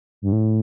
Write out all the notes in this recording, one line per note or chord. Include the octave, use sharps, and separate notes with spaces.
G2
A2